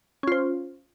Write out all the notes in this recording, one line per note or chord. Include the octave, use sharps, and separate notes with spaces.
C#4 F4 C5